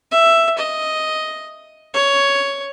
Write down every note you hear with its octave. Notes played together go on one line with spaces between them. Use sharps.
E5
D#5
C#5